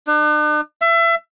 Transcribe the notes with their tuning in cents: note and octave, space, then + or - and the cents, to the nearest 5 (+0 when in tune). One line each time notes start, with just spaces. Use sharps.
D4 +45
E5 +30